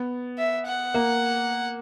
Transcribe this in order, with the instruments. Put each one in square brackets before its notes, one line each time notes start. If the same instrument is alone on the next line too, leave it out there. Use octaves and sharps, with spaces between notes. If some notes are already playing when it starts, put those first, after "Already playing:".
Already playing: [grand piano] B3
[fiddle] E5
F#5
[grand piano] A#3